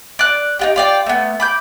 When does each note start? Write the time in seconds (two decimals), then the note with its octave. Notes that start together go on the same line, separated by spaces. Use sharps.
0.19 D5 F#6
0.59 D#4 F4 G4
0.76 F4 D5 G5
1.06 A3 B3
1.40 B5 D6 G6